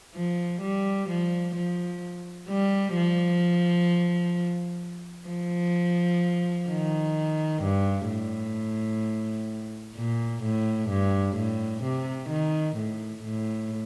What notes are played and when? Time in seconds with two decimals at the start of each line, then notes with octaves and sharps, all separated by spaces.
0.15 F3
0.62 G3
1.09 F3
1.56 F3
2.49 G3
2.96 F3
5.29 F3
6.69 D#3
7.63 G2
8.09 A2
9.96 A#2
10.43 A2
10.90 G2
11.37 A2
11.83 C3
12.29 D#3
12.76 A2
13.24 A2